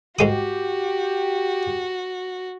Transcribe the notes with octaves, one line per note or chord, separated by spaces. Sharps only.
G#2 G#3 F#4 G4 D#6